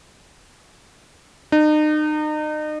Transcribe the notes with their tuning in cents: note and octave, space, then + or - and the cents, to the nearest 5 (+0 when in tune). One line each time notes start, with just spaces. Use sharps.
D#4 -35